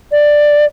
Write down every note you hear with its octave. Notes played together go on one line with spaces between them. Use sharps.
D5